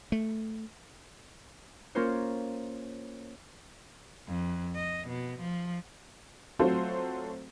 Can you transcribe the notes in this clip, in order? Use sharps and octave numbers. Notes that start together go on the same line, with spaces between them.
A3
A#3 C#4 F4 A#4 C5 C#5
F2
D#5
B2
F3
F#3 A3 C4 F4 A4 C5